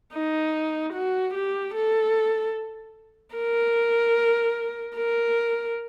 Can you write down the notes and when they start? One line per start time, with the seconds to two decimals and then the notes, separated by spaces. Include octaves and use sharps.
0.14 D#4
0.94 F#4
1.34 G4
1.75 A4
3.36 A#4
4.96 A#4